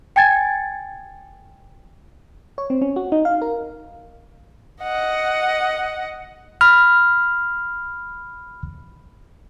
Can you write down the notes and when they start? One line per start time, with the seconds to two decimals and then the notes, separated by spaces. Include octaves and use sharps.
0.16 G5 G#5 G#6 A6
2.58 C#5
2.70 C4
2.82 C#4
2.96 F#4
3.12 D#4
3.25 F5
3.42 A#4
4.83 D#5 F#5
6.61 B5 F6